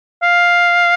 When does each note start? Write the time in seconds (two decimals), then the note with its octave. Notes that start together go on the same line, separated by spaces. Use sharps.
0.23 F5